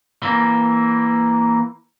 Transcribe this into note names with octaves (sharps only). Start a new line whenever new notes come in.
E3 A#3